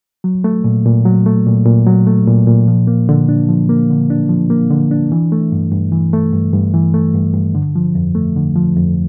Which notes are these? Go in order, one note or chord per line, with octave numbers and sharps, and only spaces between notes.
F#3
A3
A#2
A#2
F#3
A3
A#2
A#2
F#3
A3
A#2
A#2
F3
A#3
D3
D4
F3
A#3
D3
D4
F3
A#3
D3
D4
E3
A3
G2
G2
E3
A3
G2
G2
E3
A3
G2
G2
D3
F3
F2
A3
D3
F3
F2